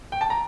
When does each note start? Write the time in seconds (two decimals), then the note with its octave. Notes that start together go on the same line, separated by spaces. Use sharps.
0.12 G5
0.21 A5
0.30 A#5